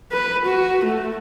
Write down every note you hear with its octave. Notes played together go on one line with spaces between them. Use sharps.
B4
F#4
A3